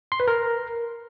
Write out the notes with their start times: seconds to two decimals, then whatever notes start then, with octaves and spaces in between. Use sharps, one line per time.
0.12 C6
0.20 B4
0.28 A#4